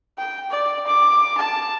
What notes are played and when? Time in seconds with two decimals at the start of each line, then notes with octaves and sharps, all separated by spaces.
0.18 G5
0.50 D5
0.87 D6
1.37 A5